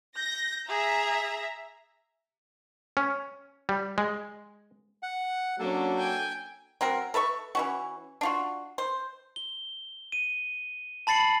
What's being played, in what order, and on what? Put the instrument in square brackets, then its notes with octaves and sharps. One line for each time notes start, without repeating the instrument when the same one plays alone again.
[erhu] G6 [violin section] A#6
[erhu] G#4 [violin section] E5 A#5
[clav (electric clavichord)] C#4
G3
G#3
[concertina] F#5
[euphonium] F#3 [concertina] A#3 A4 [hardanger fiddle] C#4 D4
[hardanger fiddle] G5 G#5
[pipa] F#3 C4 A#4
A4 B4 E5 C#6
E3 C#4 F#4
D4 F4 F#4
C5
[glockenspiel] G7
D#7
A5 B5 A6 C7 C#7 F#7